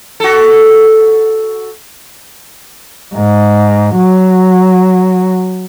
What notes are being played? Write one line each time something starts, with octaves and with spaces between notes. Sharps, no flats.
F#4 A4
G#2
F#3